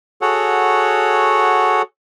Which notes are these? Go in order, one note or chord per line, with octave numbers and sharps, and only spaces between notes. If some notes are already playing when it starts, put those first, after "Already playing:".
F#4 G#4 A4 C#5 F#5